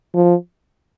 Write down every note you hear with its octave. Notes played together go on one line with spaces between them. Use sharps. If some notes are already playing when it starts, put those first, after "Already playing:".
F3